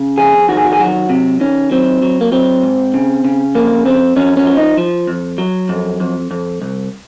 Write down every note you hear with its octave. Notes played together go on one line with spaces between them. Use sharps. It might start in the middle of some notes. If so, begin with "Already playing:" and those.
Already playing: C#3
F2 G#4
D#3 F#4
G#4
F#4
G#4
F#3 F#4
C3
D#3 C#4
F#3 C4
F#3
A#3
F#3 C4
G#2
C#3
C#3
F2 A#3
F2 C4
F2 C#4
C#4
F3
D#4
F3
F2
F#3
F2
F2
F2
C2